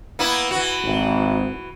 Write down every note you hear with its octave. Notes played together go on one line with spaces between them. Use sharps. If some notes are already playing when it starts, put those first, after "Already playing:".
A#3 B3 E4
E3 F#4
G#1